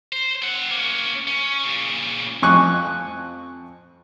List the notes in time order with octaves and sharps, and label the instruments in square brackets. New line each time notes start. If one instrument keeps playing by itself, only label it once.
[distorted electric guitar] C5
C4 F#5
A#3 C#4
C#4
A#2 C#3
[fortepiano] F2 G#5 C#6 F#6